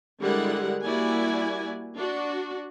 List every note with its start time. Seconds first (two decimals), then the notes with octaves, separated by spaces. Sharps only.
0.21 D3 G3 G#3 E4 A#4 F#5
0.84 G3 A#3 E4 F#4 D5 G#5
1.96 D4 F#4